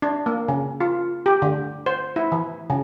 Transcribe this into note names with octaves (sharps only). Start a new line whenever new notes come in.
D4
A#3
C#3
F4
G4
D3
C5
E4
E3
C#3